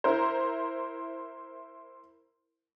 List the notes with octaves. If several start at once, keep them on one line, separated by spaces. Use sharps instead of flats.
E4 A#4 C5